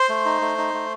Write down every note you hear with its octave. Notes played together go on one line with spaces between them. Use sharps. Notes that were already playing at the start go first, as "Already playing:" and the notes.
Already playing: C5 C6
A3
D#4
A3
D#4
A3